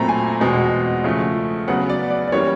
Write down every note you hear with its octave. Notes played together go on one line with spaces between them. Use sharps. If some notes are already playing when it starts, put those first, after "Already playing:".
Already playing: A#2 F#3 A3 C4 A#5 B5
G#5
E2 B2 G#3 C4
C#3 F3 A3
C#3 F#3 B3 F#5
D5
D5
D5
E3 G3 A#3 C#4 C#5